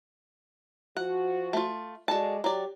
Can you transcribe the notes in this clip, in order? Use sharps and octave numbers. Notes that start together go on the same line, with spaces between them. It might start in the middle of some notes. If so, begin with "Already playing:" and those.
F3 F#4 F#5
A3 F4
G#3 F#4 A4 D5 A5
F#3 G4 D5